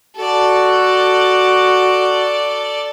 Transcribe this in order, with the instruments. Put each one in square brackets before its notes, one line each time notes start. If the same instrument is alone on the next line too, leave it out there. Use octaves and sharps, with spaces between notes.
[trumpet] F#4 [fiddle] A4 D5